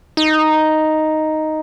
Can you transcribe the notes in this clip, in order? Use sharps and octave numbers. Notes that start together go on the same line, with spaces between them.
D#4